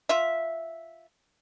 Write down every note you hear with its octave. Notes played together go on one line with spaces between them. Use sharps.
F4 E5